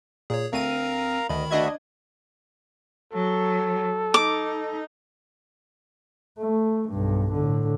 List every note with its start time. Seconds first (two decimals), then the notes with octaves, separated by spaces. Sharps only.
0.30 A#2 G#4 C#5
0.53 D2 C4 A#4 F5 A#5 D#7
1.29 D2 D#3 D#5 B5
1.51 D2 D4 F#4 D#5 E5 G#6
3.14 F#3 A4
4.14 D#4 D6
6.39 A3
6.90 B1 G2
7.33 A2 D3